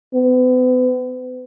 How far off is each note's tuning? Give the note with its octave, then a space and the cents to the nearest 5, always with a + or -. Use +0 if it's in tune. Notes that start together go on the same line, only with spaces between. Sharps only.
B3 +40